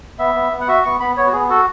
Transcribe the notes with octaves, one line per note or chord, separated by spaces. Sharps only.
B3 E5
B3
B3
F#5
F#4 E5
B3 C#6
B3 B5
B3 C#5
F#4
B3 G#4
F#4 A4